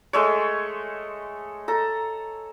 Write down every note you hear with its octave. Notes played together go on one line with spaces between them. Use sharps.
G#3 A3 C#5
A4 A#5